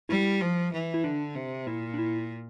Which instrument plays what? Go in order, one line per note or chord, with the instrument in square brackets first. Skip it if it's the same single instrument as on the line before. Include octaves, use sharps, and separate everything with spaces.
[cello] G3 [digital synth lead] E4
[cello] F3
E3
[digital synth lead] E4
[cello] D3 [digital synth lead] D4
[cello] C3
[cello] A#2 [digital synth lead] E4
[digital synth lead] D4
E4